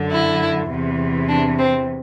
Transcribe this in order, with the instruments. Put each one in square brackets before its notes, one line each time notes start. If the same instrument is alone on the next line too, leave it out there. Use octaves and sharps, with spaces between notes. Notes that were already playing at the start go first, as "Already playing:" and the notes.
Already playing: [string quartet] F#2 D3
E4
E2 C3 E3
D4
C4